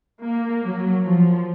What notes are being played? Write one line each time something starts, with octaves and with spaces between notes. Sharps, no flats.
A#3
F#3
F3